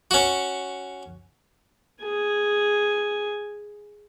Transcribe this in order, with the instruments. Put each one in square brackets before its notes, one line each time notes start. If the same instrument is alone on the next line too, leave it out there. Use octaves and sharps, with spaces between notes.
[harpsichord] C#4 F#4
[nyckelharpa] G#4 G#5